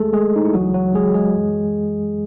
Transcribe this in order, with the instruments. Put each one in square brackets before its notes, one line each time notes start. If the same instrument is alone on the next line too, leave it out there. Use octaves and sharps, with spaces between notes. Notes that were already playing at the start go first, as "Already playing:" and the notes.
Already playing: [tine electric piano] D#2 D#3 G#3 A3 G#4 A4
G#3 G#4
D#4
E4
C#2 C#3 E3 F#3 F#4
F#3 F#4
G#3 G#4
G#3 G#4
F#2 E3